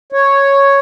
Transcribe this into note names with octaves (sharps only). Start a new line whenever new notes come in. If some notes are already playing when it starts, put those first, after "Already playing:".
C#5